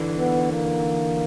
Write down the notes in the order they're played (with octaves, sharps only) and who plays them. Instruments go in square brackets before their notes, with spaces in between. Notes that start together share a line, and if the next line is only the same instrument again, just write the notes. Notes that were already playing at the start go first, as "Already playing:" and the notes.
Already playing: [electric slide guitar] D3 E3
[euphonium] B3
A#3